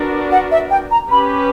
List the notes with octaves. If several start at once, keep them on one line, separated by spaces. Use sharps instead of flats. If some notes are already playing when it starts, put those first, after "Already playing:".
Already playing: B3 D4 F#4 A#4
F#5
E5
G5
A#5
C#4 G4 B4 B5